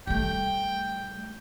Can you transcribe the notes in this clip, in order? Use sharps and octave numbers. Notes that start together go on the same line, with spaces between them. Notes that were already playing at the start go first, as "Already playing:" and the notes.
G3 A3 G5